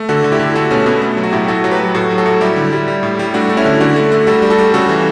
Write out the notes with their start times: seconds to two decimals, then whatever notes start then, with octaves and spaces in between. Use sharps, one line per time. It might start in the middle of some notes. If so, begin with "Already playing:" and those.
Already playing: A3
0.09 D3 F#4 A4
0.24 D3
0.32 E4 G4
0.39 D3
0.55 A3 F#4 A4
0.71 B2 A3 C#4
0.86 B2 B3
1.02 A3
1.17 F#3
1.23 F#4
1.32 A2 E4 G4
1.48 A3 F#4 A4
1.64 F#3
1.71 G4 B4
1.80 F#3
1.95 A2 F#4 A4
2.11 F#3
2.18 F#4 A4
2.26 A2
2.41 G3 E4 G4
2.56 D3
2.72 G3
2.88 G3
3.03 A2
3.19 G3
3.34 A3 D4 F#4
3.49 A3
3.57 C#4 E4
3.65 D3
3.80 D3 D4 F#4
3.96 A3
4.12 A3
4.27 G3 F#4 A4
4.42 G3
4.50 F#4 A4
4.59 G3
4.74 C#3 F#4 A4
4.89 E3